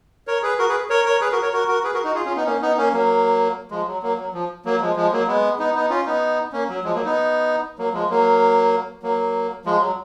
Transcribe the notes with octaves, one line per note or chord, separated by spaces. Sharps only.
A#4 C#5
G#4 B4
F#4 A#4
G#4 B4
A#4 C#5
A#4 C#5
G#4 B4
F#4 A#4
A#4 C#5
F#4 A#4
F#4 A#4
G#4 B4
F#4 A#4
D#4 F#4
F4 G#4
C#4 F4
B3 D#4
A#3 C#4
B3 D#4
A#3 C#4
F#3 A#3
F3 G#3
F#3
F#3 A#3
F#3
F3
F#3 A#3
F3 G#3
F3 G#3
F#3 A#3
G#3 B3
B3 D#4
B3 D#4
C#4 F4
B3 D#4
A#3 C#4
F#3
F3 G#3
F#3 A#3
B3 D#4
F#3 A#3
F3 G#3
F#3 A#3
F#3 A#3
F3 G#3
F#3